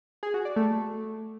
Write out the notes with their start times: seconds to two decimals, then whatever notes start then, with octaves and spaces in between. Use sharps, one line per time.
0.23 G#4
0.34 F#4
0.45 D5
0.56 A3